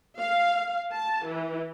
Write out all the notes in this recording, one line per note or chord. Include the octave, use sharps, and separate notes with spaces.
F5
A5
E3